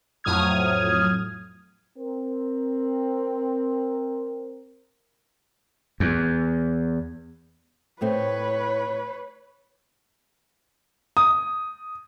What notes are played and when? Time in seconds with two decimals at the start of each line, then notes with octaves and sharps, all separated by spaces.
0.24 F2 A2 F#3 D#6 F6 G#6
1.97 C4 A#4
6.00 E2
8.01 A2 A3 C4 B4 C#5
11.17 D#6